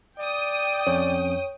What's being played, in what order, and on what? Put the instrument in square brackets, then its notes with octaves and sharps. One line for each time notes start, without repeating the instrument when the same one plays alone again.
[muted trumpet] D5 [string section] G5 D#6
[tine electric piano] F2 C#4 [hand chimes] C#5